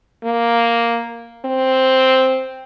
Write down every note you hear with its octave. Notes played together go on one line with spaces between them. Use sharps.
A#3
C4